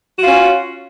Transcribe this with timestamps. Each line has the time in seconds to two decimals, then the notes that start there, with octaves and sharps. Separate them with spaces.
0.19 F#4
0.22 F4
0.26 C#4